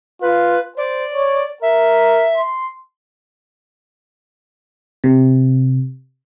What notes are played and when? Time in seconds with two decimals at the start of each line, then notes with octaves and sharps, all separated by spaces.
0.22 F4 B4
0.77 C5 D5
1.14 C#5
1.62 A#4 E5
2.37 C6
5.04 C3